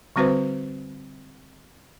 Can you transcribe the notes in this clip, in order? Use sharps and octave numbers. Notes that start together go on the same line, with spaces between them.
D3 G3 C4 F#4 B4 C5